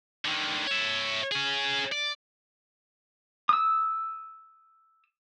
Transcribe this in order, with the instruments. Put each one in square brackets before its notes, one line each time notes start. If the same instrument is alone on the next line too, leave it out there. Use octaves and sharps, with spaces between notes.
[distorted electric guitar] D3 D#3
C#5 E5
C#4 G#4
D5
[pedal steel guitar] D#6 E6